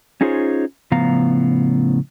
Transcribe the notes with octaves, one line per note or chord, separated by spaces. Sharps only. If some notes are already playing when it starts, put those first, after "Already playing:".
C#4 D#4 F4 G#4 C5 C#5
A2 C#3 F3 B3 F5 A#5